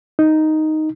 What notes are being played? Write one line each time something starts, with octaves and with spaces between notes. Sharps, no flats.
D#4